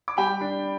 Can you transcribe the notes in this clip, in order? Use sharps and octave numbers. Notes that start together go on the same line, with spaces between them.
D6
G3 G5 B5
D4